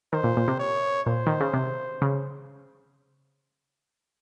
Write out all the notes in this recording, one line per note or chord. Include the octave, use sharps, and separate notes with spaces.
D#3 C5
A#2
A#2
C3
C#5
A#2 C5
D#3
C#3
C3
C#3